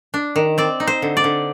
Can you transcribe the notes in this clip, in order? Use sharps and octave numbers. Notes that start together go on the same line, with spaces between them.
D4
D#3
C4 D5
D#4
C5
D3
D5
D3